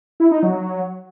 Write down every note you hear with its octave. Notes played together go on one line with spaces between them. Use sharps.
E4
D#4
F#3